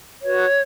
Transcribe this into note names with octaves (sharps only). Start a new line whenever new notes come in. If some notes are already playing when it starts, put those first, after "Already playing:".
F#4 B4 C#5